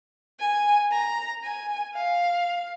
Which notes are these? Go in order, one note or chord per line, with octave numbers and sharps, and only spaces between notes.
G#5
A#5
G#5
F5